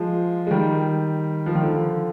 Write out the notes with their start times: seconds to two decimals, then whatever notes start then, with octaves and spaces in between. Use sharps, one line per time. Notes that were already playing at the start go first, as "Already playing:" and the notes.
Already playing: F3 G#3
0.47 G#3
0.51 D#3 G3
1.46 F3
1.55 D#3
1.63 D3 F3